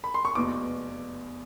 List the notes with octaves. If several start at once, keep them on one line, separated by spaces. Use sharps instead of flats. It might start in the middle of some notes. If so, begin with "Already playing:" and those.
B5
C6
C#6
F1 E2 B2 D6